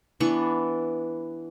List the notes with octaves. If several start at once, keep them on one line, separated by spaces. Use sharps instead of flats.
E3 B3 D4 C#6